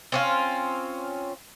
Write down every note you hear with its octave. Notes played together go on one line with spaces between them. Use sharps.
C4 C#4 F4